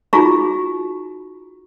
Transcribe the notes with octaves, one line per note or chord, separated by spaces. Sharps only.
D#4 F4 F#4 G#4 A#5 C#6